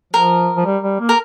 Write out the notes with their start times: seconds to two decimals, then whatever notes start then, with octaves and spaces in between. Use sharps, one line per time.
0.13 F3 A#4
0.57 F3
0.66 G3
0.84 G3
1.00 A#3
1.09 A#4